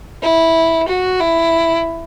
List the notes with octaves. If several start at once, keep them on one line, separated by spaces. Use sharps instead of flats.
E4
F#4
E4